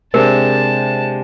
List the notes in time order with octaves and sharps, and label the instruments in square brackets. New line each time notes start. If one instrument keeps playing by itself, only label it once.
[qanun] C3 [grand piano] G#3 D4 [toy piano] A#4 [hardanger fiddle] A5